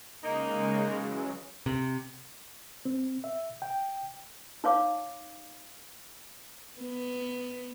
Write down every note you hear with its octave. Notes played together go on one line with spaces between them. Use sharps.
C#3 G#3 A#3 D#4
E3 F#3
C3
C4
E5
G5
D#4 C#5 F5 D6
B3